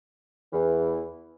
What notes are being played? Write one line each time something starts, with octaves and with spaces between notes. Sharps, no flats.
E2 E3